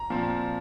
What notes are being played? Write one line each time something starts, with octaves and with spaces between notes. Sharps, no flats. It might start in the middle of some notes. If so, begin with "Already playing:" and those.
Already playing: A#5
A#2 F3 C4